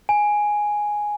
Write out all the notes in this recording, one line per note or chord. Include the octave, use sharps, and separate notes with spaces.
G#5